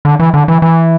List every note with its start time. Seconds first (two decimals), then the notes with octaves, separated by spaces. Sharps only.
0.05 D3
0.20 E3
0.34 D3
0.48 E3
0.62 E3